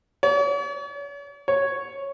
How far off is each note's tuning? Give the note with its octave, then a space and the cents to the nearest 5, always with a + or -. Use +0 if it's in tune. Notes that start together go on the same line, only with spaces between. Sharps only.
C#5 +45
C#5 -5